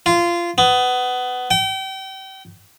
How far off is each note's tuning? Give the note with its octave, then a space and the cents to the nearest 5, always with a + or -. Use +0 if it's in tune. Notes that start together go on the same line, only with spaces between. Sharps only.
F4 -20
B3 +20
G5 -35